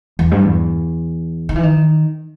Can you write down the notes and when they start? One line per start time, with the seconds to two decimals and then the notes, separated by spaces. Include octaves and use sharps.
0.19 E2
0.31 G2
0.45 E2
1.49 D#3
1.56 E3
1.63 D#3